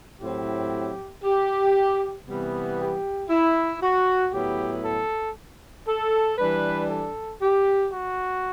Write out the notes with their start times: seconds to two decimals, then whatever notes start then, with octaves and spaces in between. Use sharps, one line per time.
0.21 A2 F#3 C4 E4 G4
1.24 G4
2.27 C3 E3 G3 B3
2.79 G4
3.30 E4
3.82 F#4
4.33 A2 F#3 B3 E4 G4
4.85 A4
5.87 A4
6.38 E3 G3 D4 B4
6.90 A4
7.42 G4
7.93 F#4